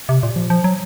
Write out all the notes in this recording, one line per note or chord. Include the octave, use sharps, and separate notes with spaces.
C3
A#2
F3
F3
F#3